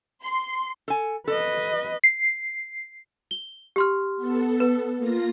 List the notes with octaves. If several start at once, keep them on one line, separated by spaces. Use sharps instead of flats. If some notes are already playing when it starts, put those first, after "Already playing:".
C6
A4 G#5
A4 B4 D#5
C7
G7
G4 C6 F6
B3 A4
B4
A#3 F4 A#6